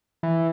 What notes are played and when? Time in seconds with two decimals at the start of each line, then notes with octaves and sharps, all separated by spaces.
0.23 E3